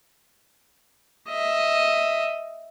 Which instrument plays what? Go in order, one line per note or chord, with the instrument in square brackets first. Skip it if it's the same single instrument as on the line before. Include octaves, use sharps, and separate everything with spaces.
[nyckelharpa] D#5 E5